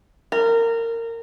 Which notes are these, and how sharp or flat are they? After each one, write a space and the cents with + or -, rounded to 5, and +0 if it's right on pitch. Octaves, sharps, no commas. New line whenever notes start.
A#4 -20